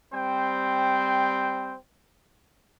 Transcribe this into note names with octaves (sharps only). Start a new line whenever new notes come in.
G3 C4 C5 G5